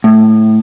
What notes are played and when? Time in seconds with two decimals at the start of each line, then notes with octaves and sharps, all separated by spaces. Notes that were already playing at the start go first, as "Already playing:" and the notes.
0.04 A2